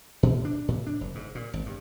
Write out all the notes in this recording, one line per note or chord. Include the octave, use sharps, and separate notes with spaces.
A#2
D4
A2
D4
F#1
G#2
A#2
G#1
G2